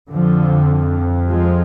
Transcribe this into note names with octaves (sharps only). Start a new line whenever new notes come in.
F2 D3 F3
F3 G#3